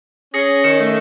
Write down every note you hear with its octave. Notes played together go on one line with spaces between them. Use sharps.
C#4 G#4 A#6 C#7
D#3 C#7 E7
A3